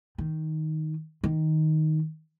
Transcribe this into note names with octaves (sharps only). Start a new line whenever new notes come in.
D#3
D#3